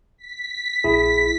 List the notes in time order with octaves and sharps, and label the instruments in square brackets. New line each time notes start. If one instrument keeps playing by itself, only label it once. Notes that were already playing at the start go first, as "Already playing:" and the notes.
[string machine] B6
[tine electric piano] A#1 E4 G#4